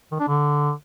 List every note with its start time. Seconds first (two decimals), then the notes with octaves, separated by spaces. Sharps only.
0.12 D#3
0.20 D4
0.28 D3